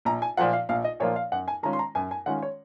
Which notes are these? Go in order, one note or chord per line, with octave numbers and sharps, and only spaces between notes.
A#1 A#5
G#5
A#2 F3 A#3 F4 F#5
F5
A#1 F5
D#5
A#2 F3 A#3 F4 C#5
F5
F#2 F#5
G#5
D#3 G#3 C#4 F4 A#5
C6
A#5
F#2 G#5
G#5
D#3 G#3 C#4 F4 F#5
C#5